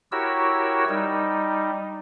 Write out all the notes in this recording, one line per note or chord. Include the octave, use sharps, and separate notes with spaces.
E4 F#4 G4 A#4 C#5 E6
G3 D#4